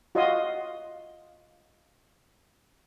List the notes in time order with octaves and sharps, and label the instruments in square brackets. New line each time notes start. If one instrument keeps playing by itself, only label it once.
[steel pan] F4 F#4 D#5 F5 C6 D#6